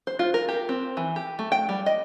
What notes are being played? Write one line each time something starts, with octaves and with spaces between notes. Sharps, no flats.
C5
F4
A#4
G4
C4
E3
G4
A3
G5
G3
D#5